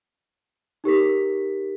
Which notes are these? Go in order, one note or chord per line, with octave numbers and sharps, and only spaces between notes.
D#4 G4 A#4 B6